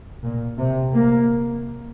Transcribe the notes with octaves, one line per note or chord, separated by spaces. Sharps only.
A#2
C3
A#3